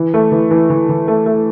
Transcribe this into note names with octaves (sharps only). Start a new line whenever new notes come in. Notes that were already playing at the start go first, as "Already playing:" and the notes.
Already playing: E3
A3
E3
E3
E3
E3
A3
A3